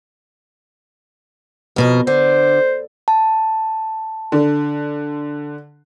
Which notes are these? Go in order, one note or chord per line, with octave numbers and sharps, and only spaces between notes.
F2 B2 A#4
D3 C5
A5
D3